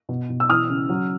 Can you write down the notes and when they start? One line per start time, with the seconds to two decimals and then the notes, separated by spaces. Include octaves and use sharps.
0.09 B2
0.30 B2
0.40 E6
0.49 E3 D#6 F6
0.70 C#3
0.89 F#3